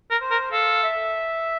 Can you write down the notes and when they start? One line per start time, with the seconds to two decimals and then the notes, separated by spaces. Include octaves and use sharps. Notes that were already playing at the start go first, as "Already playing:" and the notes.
0.11 A#4
0.21 C5
0.31 A#4
0.52 A4 F5
0.83 E5